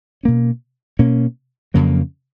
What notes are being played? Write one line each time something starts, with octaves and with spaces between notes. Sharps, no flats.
B2 A#3 C#4
B2 A#3 C#4
F2 C#3 F#3 A#3